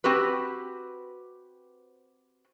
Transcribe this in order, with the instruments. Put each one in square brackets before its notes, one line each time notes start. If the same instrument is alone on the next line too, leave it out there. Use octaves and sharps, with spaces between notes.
[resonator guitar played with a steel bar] C4 F#4 G4 B4